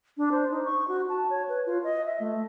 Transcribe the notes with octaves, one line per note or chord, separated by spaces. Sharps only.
D4
C5
D#4
C#6
F#4
A5
C#5
B4
F4
D#5
E5
A3